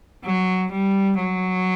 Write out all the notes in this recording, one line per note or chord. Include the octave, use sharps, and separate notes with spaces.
F#3
G3
F#3